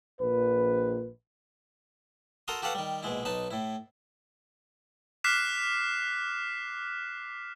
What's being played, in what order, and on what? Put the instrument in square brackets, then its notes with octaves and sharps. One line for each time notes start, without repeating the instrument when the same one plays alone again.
[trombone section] A#1 B4
[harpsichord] F#4 A4 A#4 A#5 C6 D#6
F#4 G4 A4 B4 F5 F#5
D#3 G3
A#1 B2 G#3 E4
B1 D#4 B4 A5
A2 E4
[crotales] D6 F6 F#6 B6 C7 E7